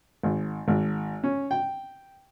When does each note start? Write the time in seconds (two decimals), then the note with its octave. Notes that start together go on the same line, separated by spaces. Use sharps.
0.23 G#1
0.68 G#1
1.24 C#4
1.51 G5